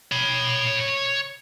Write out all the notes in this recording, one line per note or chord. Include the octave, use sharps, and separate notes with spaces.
C#5 B5